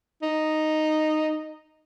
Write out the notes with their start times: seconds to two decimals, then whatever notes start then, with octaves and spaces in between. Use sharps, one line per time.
0.22 D#4